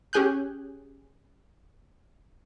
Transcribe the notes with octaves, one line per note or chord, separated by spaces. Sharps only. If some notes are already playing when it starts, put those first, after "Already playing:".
C#4 G4 G#4 G#5 F#6 G6